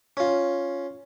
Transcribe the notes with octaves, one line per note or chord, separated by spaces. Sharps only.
C#4 F4